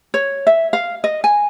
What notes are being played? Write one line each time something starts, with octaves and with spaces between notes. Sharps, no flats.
C#5
E5
F5
D#5
G#5